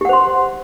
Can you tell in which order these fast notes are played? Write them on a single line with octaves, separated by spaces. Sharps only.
G4 F#5 C5 C6